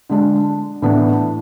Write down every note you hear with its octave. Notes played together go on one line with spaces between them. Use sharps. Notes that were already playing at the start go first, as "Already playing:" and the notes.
D3 G#3 D4
A2 E3 B3 D4